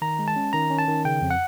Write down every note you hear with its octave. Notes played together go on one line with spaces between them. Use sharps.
D#3 A#5
G#3
A5
C#4
D#3 A#5
C#4
A5
D#3
C#3 G5
F2
F#5